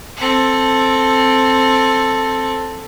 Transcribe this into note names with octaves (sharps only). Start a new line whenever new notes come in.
C4 A4